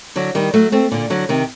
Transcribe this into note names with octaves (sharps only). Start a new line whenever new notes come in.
D3 F#3
D#3 G3
F#3 A3
A3 C4
A#2 D3
D3 F#3
C3 D#3